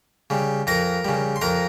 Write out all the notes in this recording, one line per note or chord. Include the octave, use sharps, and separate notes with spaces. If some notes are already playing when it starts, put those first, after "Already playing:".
C#3 G3
F2 A#4 A#5
C#3 G3
C6
F2 A#4 A#5